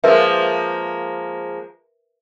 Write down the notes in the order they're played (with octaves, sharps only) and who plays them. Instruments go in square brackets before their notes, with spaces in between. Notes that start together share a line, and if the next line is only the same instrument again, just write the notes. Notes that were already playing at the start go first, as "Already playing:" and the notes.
[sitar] F3 G#3 A#3 [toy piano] A#4 B4 E5